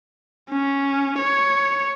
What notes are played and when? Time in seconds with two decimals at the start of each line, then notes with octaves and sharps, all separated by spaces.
0.50 C#4
1.19 C#5